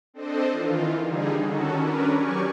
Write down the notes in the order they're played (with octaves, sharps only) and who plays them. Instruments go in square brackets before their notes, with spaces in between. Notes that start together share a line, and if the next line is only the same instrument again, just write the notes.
[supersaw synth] C4 D4 A4 C5 D#5
D#3 E3 F4
D3 G3 D#4 G#4
D#3 C#4 F#4 A4
C#4 D4 A#4 B4
F#3 G4 D5 G#5 C#6